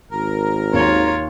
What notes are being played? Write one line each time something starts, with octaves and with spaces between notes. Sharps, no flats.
G#1 A#4
D#2 F4 C#5